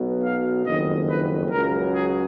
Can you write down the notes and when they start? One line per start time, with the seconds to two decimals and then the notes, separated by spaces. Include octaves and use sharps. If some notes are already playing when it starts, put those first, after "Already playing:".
Already playing: B1 B2 F#3
0.23 F5
0.65 F#1 F2 D#3 D#5
1.08 B4
1.51 C#2 C#3 F#3 A#4
1.93 G#4